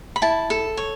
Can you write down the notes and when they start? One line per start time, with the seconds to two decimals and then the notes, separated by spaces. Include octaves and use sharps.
0.16 B5
0.22 E4 A5
0.50 A4
0.77 C#5